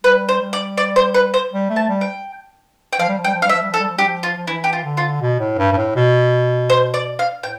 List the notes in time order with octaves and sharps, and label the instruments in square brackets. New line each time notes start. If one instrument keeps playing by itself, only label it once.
[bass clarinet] G3 [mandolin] B4
[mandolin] C5
[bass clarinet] G3
[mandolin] D5
D5
C5
B4
C5
[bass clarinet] G3
A3
[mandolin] A5
[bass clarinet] G3
[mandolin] G5
G5
[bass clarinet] F3 [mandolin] F5
[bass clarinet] G3
F3
[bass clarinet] G3 [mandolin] G5
[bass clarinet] F3
[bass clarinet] G3 [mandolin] F5
[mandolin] E5
[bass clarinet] F3
G3
[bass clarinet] F3 [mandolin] A4
[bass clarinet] G3
F3
[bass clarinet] G3 [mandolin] G4
[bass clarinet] F3
[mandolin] F4
[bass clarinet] F3
[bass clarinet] E3 [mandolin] E4
[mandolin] G4
F4
[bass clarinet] D3
[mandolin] F4
[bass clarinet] B2
A2
G2
G2
A2
B2
[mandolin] C5
D5
F5
[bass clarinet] A2 [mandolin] G5